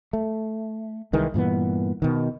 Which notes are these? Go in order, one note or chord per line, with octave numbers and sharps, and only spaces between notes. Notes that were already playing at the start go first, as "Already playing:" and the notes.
A3
C2 D#3 E3 G#3
G2 A#2 E3 B3
B2 D#3